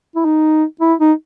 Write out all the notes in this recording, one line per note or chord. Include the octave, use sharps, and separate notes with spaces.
E4
D#4
E4
D#4